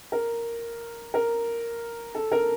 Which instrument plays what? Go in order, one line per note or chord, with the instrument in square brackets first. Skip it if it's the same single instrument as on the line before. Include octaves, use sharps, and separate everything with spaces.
[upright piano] A#4
A#4
A4
A#4